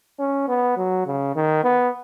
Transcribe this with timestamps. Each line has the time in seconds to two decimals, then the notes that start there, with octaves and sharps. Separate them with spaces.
0.19 C#4
0.48 B3
0.77 F#3
1.06 C#3
1.35 D#3
1.63 B3